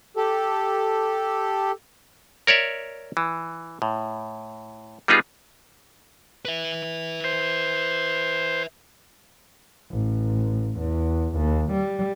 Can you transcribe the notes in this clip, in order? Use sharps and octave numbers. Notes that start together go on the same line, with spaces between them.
G4 A4
A#4 C#5 D5 E5
E3
A2
G3 B3 D#4 F4 G#4
B4 E5
C5
A1
E2
D#2
G3